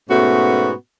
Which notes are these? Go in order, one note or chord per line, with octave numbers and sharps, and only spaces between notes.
G#2 B2 A3 B3 C#4 F#4